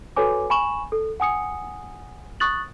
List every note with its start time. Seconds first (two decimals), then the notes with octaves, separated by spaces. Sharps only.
0.16 F#4 A4 B4 C#5 G#5 D6
0.50 G#5 B5 C#6 E7 F#7
0.92 A4
1.20 F#5 G#5 D#6 C#7
2.40 C#6 D#6 F#6 A6 F#7